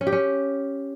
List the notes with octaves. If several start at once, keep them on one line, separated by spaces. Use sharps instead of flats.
C#4
G4
C#4